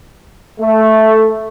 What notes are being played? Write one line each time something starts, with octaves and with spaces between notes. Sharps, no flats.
A3